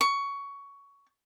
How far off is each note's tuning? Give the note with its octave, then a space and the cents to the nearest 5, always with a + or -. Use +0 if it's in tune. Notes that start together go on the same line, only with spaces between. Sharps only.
C#6 +15